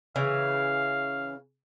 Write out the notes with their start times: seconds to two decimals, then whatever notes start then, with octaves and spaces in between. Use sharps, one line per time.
0.16 C#3 E3 F5